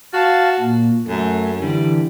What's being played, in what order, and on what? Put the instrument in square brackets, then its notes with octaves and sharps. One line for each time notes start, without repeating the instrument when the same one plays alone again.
[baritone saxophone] F#4 [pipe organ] F5 A5
[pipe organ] A#2
[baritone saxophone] F#2 [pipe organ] A3
[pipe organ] D3 E3 [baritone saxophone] G3